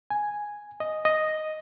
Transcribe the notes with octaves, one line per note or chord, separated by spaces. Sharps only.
G#5
D#5
D#5